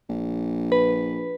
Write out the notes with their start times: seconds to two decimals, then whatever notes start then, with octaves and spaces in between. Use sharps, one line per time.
0.09 A#1
0.72 B4